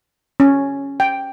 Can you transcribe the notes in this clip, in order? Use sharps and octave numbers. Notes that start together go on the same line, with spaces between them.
C#4
G5